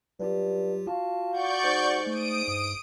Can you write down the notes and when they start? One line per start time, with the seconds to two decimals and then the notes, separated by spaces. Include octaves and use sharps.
0.20 G2 F#3 F4 G4
0.87 F4 F#4 A5
1.31 F#4 D5 F#5 C#6 G6
1.63 G#2
2.07 A3 D#6 D7
2.48 G2